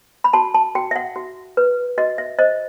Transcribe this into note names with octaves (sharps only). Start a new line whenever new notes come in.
B5
F#4 A5
A5
F#4 G5
E5
F#5
F#4
B4
F#4 D#5
E5
C5 D#5